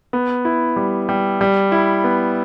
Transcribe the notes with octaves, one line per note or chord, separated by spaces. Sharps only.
B3
E4
G3
G3
G3
E4
B3